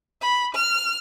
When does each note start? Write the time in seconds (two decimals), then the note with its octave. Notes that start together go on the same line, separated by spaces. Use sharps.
0.20 B5
0.54 F6